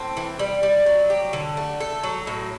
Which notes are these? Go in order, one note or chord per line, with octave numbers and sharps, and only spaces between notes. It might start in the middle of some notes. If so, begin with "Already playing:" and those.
Already playing: A2 C4
E3
G3
G3
F#3
G4
D3
A3
A4
F#3
A2